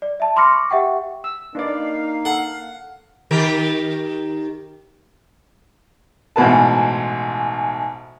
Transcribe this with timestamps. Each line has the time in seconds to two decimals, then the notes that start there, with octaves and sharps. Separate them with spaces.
0.02 D5
0.20 E5 A5
0.36 B5 C6 D6 F6 A#6 C#7
0.50 C#6 D6
0.70 G4 E5 F#5 G5 C#6
1.24 E6
1.55 A#3 D4 D#4 B4 D5 F5
2.25 A4 F#5
3.31 D#3 G4 A#4
6.36 A1 G#2 B2 B4 A5